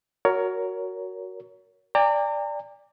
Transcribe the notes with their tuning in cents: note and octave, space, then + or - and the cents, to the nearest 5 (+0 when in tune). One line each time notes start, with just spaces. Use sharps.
F#4 +0 A#4 +0 C#5 +20
D5 +0 G5 +45 A#5 -40